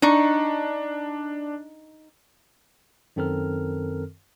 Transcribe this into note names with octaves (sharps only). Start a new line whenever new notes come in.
D4 D#4 C#6
F#2 D#3 C4 A4 A#4 F6